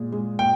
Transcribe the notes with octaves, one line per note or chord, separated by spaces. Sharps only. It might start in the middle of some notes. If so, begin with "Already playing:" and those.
Already playing: A#2 G#3
G#3
A#2 G5